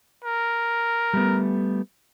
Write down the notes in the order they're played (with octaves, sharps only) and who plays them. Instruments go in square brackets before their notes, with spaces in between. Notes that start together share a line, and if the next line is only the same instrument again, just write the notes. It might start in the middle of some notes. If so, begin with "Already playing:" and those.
[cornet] A#4
[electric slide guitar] G3 A3 B3